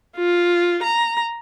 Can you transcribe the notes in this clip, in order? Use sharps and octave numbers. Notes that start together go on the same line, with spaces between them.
F4
A#5